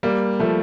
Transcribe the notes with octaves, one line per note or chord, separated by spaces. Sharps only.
G3 A#3
F3 A3